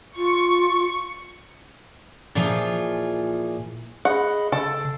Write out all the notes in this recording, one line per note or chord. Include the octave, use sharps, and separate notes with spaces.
F4 C#6
A#2 E3 F3 F4 G#4
G#4 D#5 F#5 B5
C#3 A4